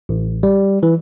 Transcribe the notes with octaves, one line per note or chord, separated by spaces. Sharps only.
A1
G3
E3